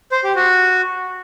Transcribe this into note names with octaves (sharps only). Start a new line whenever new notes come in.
C5
G4
F#4